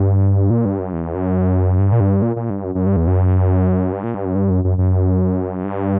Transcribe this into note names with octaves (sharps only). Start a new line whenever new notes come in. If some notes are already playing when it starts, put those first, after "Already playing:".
Already playing: G2
A#2
G2
F#2
E2
F#2
G2
A#2
G2
A#2
A#2
G2
F#2
F#2
G2
E2
F#2
G2
A#2
G2
F#2
G2
F#2
F#2
F#2
G2